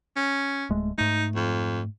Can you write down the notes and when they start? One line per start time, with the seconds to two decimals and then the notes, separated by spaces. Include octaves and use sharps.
0.16 C#4
0.70 D1 G#3 A3
0.98 G#2 A3 D#4
1.36 F2